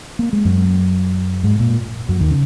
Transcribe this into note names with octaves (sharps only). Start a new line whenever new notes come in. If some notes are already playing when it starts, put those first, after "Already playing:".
A#3
G#3
F#2 F#3
G#2 G#3
A#2 A#3
F#2 F#3
D#2 D#3
C#3